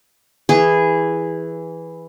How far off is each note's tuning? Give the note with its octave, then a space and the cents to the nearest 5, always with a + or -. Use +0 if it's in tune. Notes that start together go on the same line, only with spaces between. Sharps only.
E3 +0 G#4 -10